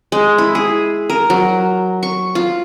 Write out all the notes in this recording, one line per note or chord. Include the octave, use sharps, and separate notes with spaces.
G#3
E4
G#4
A#4
F#3
C#6
F4